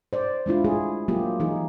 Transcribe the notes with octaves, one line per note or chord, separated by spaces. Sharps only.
C5 D5
G#3 D4 E4 F4
A3 G4 G#4
F#3 A#3 F4 G4
E3 D#4 G#4